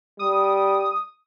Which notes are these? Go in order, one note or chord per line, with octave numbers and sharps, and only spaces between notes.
G3 D#6